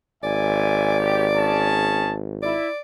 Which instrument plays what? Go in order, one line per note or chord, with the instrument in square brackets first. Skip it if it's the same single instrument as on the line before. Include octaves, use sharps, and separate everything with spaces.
[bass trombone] G#1 [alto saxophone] D5 [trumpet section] E5 G#5
[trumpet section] G4
C#4 G#4 A5
[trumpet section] E4 [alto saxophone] D5